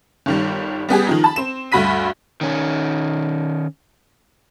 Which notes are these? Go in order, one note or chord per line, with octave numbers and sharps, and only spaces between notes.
G1 D#3 G3
G3 B3 G4 G#4
D#3 F3 D#4
A5 B5
C4 E7
D2 G2 F#4 B5 B6 D#7
D#3 C#4